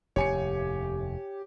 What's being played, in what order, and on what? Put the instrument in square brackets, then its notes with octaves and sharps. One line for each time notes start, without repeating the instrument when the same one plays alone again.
[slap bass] F1 D#2 A2 [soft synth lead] G4 [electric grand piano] C#5 G#5 C#7